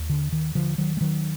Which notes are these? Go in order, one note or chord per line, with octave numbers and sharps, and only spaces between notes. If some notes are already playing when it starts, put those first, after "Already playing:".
Already playing: D#2
D3
D#3
D3 F3
D#3 F#3
G#3
D#3 F#3